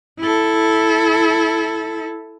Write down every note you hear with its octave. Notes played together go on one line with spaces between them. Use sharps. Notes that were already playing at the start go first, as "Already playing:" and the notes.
E4 A4